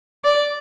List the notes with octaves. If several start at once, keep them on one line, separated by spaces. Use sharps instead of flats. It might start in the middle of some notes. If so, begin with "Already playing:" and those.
D5